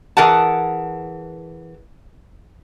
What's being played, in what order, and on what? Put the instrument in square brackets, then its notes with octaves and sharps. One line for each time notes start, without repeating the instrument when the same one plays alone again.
[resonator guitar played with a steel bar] E3 G#4 A#4 F#5 A5